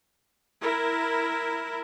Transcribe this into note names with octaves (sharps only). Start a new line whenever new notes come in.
E4 A#4